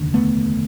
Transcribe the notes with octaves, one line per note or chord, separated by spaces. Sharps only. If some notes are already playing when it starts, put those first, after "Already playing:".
Already playing: F1 D#2 D3
A3 B3